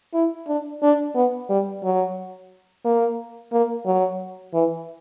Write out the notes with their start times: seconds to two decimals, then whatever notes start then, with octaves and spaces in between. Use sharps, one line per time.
0.14 E4
0.48 D4
0.83 D4
1.15 B3
1.50 G3
1.83 F#3
2.85 A#3
3.52 A#3
3.86 F#3
4.54 E3